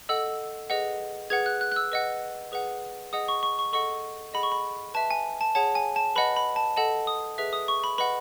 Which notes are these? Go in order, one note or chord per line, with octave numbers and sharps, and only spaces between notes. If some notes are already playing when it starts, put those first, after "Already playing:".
A4 D#5 F#5 E6
G#4 B4 D#5 F#5
G#4 B4 F#5 G#6
F#6
F#6
F#6
E6
B4 D#5 F#5
G#4 B4 F#5
G#4 D#5 F#5 D#6
C#6
C#6
C#6
A4 D#5 F#5 C#6
G#4 D#5 F#5 B5
C#6
B5
B4 E5 A5
G#5
A5
G#4 C#5 F#5 A5
G#5
A5
B4 D#5 F#5 B5
B5
A5
A4 D#5 F#5 A5
D#6
G#4 B4 E5
D#6
C#6
B5
B4 D#5 F#5 B5